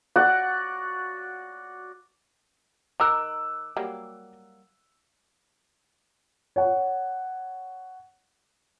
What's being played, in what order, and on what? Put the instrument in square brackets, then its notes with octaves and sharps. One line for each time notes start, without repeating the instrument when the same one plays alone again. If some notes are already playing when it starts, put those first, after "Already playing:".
[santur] F#4 D5 F#5
[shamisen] D#3 D#4 A#4 [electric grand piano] D6 E6 F#6
[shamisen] F#3 G3 A#3
[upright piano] C#5 F#5